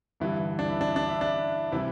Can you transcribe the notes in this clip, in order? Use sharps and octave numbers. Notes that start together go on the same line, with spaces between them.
G2 D3 E3 G3 E4
D4
E4
D4
D4
E4
D4
C3 E3 G3 E4